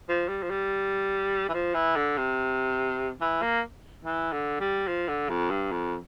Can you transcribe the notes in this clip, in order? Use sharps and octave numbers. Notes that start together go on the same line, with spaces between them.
F3
G3
F3
G3
E3
F3
E3
D3
C3
E3
A#3
E3
D3
G3
F3
D3
F2
G2
F2